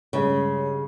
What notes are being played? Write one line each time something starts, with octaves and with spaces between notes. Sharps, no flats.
G2 C#3 G#3 C#4